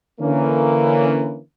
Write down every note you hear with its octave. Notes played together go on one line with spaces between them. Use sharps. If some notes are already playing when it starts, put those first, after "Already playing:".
D3 E3 A#3 C#4